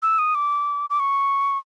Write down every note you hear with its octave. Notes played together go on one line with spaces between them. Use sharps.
E6
D#6
D6
D6
C#6